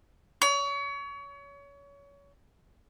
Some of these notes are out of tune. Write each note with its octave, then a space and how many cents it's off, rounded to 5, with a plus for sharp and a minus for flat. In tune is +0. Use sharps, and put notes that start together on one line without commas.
C#5 +30